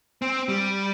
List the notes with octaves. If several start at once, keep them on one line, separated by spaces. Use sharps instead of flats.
C4
G3